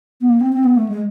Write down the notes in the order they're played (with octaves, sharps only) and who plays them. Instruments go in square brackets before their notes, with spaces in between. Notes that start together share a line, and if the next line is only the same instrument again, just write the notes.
[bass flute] B3
A#3
C4
C4
B3
A3
G#3